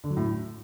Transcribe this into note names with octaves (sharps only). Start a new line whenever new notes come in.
D3
F#3
A2